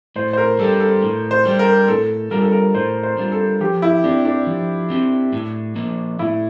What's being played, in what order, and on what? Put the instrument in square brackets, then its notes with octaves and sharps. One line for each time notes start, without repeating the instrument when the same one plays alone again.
[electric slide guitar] A2 [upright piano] C5
[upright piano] C5
A#4
[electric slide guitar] G3 D4 G4 [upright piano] A4
[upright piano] A4
[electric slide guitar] A2
[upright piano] C5
[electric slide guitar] G3 D4 G4
[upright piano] A#4
[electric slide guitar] A2 [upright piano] A4
[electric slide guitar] G3 D4 F4 [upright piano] A#4
[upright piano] A4
A#4
[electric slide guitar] A2 [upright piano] C5
[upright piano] C5
[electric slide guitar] G3 D4 F4
[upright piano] A4
[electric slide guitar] F3 [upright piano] G4
[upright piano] E4
[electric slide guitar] C4 G4 [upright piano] D4
[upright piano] D4
[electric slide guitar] F3
C4 G4
A2
F3 A#3
[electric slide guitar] A2 [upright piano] E4